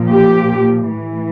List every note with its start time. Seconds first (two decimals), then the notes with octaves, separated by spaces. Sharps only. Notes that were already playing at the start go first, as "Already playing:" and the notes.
Already playing: A#2 F3
0.09 G4
0.89 A2 E3